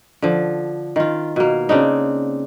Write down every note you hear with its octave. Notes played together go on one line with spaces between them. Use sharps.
D3 F3
D#3 F4
B2 A#3
C#3 C4 D4 D#4